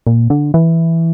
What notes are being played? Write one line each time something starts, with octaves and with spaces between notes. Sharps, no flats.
A#2
D3
E3